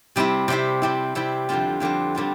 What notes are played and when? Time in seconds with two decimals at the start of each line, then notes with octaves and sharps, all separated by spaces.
0.16 C3 G3 C4 E4
0.48 C3 G3 C4 E4
0.82 C3 G3 C4 E4
1.15 C3 G3 C4 E4
1.49 F2 D3 G3 C4 F4
1.80 F2 D3 G3 C4 F4
2.15 D3 G3 C4 F4